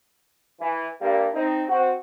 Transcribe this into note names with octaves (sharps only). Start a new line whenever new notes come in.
E3
G2 G3 A#3
C4 D#4
C4 F#4